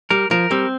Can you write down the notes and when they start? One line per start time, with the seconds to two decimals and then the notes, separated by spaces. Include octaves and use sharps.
0.10 G3 A#4
0.31 F3 A#4
0.51 G3 C4